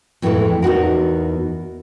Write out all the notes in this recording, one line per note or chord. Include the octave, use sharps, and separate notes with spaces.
F2 A2 E3 G#3 A4 B4
E2 D#4 F#4 A#4